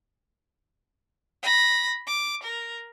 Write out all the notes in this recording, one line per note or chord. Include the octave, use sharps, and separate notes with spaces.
B5 A#6
D6
A#4